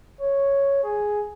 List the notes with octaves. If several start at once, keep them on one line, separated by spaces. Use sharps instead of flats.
C#5
G#4